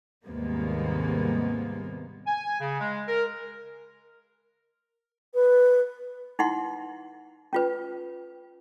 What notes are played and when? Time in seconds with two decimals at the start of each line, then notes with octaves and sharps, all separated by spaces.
0.24 D#2 G#2 C3 G3 A#3 B3
2.27 G#5
2.61 C#3
2.81 G#3
3.08 A#4
5.34 B4
6.39 D#4 E4 F#5 C6
7.53 C#4 F4 B4